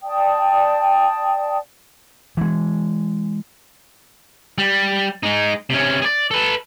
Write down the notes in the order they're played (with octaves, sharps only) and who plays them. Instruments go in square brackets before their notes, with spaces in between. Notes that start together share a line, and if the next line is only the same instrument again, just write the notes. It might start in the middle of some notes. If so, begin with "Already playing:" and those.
[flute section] D5 G5 A5 D#6
[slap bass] E3 G#3
[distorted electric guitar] G3
G#3 D#4
C3 C#4
G#4 D5
A4 B4